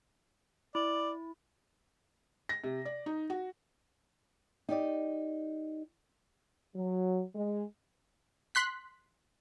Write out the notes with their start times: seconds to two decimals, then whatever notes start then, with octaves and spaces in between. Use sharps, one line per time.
0.75 E4 D5
2.49 A#6
2.64 C3
2.85 D5
3.06 D#4
3.30 F#4
4.69 D#4 G4 D5 D#5
6.75 F#3
7.35 G#3
8.55 C6 F#6 B6